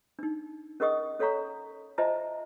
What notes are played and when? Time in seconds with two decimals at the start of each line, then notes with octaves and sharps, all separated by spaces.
0.19 D4 D#4
0.80 C#4 G#4 A#4 D#5 C#6 D#6
1.19 C#4 A4 C#5 F5 A#5 C#6
1.98 F4 C5 D#5 E5 A5 A#5